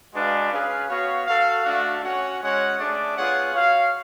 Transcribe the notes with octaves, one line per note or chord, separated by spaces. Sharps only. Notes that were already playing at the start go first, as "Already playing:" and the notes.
G#3 D4 F#4 B4 F5
C#4 G#4 B4 F5
B3 F#4 C#5 F5
F#4 A4 F5
A3 D4 F#4 A4 F5
C#4 F#4 C#5 F#5
G#3 C#4 F#4 C#5 F#5
A3 D4 G#4 D5
B3 F4 G#4 C#5 F#5
F#4 C#5 F5